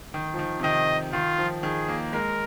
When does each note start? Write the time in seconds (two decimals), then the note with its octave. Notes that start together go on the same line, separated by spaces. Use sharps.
0.14 D#3
0.34 F3
0.39 D#3
0.60 C3
0.64 D#3 D#5
1.13 D#3 F4
1.38 F3
1.63 D#3 G#4
1.89 A#3
2.13 G#3 A#4